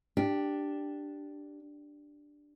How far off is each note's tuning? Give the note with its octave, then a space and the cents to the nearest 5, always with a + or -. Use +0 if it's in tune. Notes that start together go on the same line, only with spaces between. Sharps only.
D4 +0 G4 +0